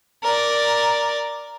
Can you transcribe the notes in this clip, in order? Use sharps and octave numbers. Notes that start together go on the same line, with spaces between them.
A#4 D5